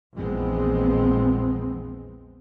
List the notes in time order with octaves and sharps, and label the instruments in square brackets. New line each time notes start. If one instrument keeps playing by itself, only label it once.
[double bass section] A#1 E2 F3 G#3 B3 C4